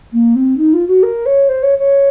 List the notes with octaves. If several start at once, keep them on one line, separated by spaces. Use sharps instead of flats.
A#3
C4
D#4
F4
F#4
A#4
C#5
C5
C#5
C#5